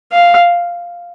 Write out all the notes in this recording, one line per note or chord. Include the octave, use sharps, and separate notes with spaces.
F5